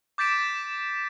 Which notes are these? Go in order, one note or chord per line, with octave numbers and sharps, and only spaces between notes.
D6 G6 A6 B6 D7 E7